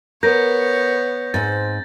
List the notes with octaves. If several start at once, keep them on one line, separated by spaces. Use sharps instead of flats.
B3 A#4 C#5 G6 A#6
G#2 C4 A6